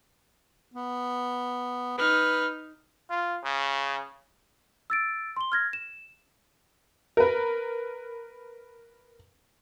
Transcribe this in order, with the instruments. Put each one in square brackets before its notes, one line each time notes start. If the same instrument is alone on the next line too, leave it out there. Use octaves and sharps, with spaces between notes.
[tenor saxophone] B3
[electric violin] D#4 F6 [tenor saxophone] B4
[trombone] F4
C#3
[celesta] E6 A6 D7
C6 G7
F6 G#6 A#6
E7
[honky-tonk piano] A#4 B4